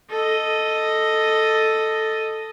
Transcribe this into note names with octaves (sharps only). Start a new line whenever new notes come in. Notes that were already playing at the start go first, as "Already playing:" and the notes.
A4 D#5